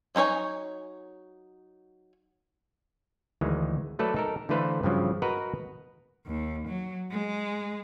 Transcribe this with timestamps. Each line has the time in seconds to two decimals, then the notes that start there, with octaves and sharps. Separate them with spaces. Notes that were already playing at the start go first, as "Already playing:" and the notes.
0.15 F#3 G#3 D#4 C#5 G#5
3.41 D2 D#3 E3 G#3
3.99 F#3 A3 A4 B4 D5
4.14 D#4 A4 A#4
4.49 D3 E3 A3 B4 C5 F5
4.83 G2 C#3 F3 F#3
5.22 F#4 A#4 B4 D#5 A#5
6.27 D#2
6.68 F#3
7.12 G#3